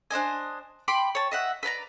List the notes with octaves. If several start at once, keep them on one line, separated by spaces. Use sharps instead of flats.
D4 C5 D#5 G#5
G5 B5 C6 D6
C#5 A5
D#5 E5 F#5
B4 D5 A5 A#5